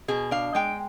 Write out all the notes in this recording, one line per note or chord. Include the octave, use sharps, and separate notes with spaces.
B2 G#4
D4 F5
G#3 G5